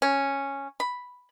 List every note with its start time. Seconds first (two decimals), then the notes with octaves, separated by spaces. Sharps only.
0.02 C#4
0.80 B5